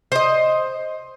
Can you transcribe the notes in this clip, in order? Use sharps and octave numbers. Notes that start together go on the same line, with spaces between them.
C5 D#5